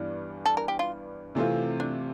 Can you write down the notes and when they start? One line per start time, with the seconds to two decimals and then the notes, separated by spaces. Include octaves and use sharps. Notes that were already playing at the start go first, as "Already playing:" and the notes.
Already playing: G2 E3 G3 B3 D4
0.46 A4
0.57 A#4
0.68 G4
0.79 F4
1.35 C3 E3 A3 C4 F4
1.80 D4